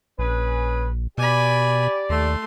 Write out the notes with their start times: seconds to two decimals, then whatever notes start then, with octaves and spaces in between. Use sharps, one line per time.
0.19 A#1 C#4 G#4 B4
1.18 B2 G4 D5 G#5 B5
2.10 D#2 A3 C6